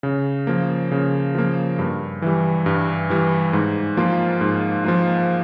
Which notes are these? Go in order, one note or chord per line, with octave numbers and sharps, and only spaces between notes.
C#3
F3 A#3
C#3
F3 A#3
G2
E3 G3
G2
E3 G3
G#2
F3 A#3 F4
G#2
F3 A#3 F4